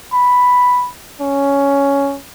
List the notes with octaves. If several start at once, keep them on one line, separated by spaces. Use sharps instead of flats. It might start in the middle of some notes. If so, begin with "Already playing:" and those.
B5
C#4